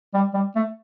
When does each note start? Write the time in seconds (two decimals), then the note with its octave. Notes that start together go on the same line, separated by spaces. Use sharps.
0.14 G3
0.34 G3
0.56 A3